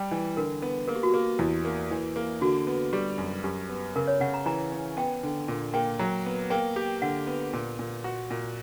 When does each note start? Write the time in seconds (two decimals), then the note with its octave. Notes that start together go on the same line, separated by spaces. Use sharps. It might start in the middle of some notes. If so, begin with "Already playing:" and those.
Already playing: G3 G5
0.11 E3
0.37 D3 A#4
0.62 B3
0.88 A#3 A#4
0.96 G4
1.03 F#4
1.11 A#3 G4
1.39 E2 E4
1.65 A#3
1.91 E3
2.16 A#3
2.41 D3 F#4
2.67 B3
2.93 G3 G4
3.18 F#2
3.43 F#2 G4
3.69 B3
3.95 C#3 A#4
4.08 C#5
4.20 C#3 F#5
4.34 A#5
4.46 E3 A#5
4.72 C#4
4.97 B3 G5
5.23 D3
5.48 A#2
5.74 A#3 G5
5.99 F#3 A#5
6.26 B3
6.50 A#3 G5
6.76 G4
7.02 D3 F#5
7.27 B3
7.53 A#2
7.79 A#2
8.04 F#4
8.31 A#2